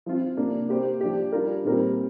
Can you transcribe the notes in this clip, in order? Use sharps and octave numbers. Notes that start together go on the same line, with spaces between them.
F3 C4 F4
C3 A#3 D4
A#3 G4 C5
F3 D4 G4
G3 D4 F4 A#4
A#2 G3 C4 A#4